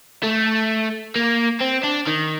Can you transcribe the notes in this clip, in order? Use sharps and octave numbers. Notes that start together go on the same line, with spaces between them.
A3
A#3
C4
D4
D#3